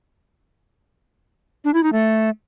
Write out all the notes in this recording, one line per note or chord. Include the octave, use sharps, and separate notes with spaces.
D4
E4
D#4
A3